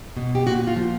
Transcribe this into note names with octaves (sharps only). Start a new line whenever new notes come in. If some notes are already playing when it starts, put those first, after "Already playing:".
B2
G4
A#2 F#4
F4
F3